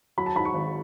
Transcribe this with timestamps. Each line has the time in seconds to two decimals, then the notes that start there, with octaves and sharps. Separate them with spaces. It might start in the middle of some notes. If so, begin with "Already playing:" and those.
0.18 F#3 B5
0.26 A5
0.36 G#2 B5
0.45 C#6
0.54 G#1